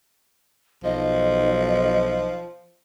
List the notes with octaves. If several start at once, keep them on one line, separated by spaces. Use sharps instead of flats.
B1 F3 D#5